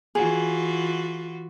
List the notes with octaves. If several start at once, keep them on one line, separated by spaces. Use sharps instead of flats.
E3 F4 F#4 G#4